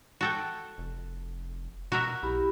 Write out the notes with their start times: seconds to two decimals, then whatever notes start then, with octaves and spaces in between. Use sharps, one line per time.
0.21 F#4 A4 G5
0.78 F1
1.92 B2 F#4 A#4 E5
2.23 B1 E4 G4 B5